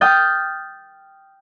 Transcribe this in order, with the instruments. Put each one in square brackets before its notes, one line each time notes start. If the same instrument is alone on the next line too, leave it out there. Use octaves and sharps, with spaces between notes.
[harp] G5 D#6 F6 G6 A6